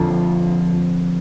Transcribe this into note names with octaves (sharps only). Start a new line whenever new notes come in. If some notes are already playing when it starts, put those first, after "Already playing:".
Already playing: F2 D3 F3 F4 A4